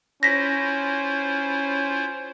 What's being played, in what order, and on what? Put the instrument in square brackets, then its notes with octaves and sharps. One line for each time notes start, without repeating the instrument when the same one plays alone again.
[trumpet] C#4 [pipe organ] E4 F4 C5 [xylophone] A#6 B6